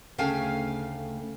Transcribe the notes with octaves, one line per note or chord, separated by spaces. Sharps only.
D2 C#3 A3 F5 G5 G#5